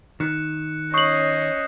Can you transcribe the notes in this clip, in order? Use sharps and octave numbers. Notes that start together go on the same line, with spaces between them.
D#3 F#6 C#7 E7
C#4 C#5 D#5 C#6 D#6 G6 C7 F#7